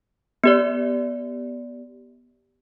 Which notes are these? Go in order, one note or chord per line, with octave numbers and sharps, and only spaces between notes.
B3 G4 D5